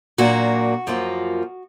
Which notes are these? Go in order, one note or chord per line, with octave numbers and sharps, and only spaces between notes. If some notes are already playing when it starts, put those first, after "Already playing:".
A#2 F#3 A#3 D4 F#4
F#2 F3 A#3 F4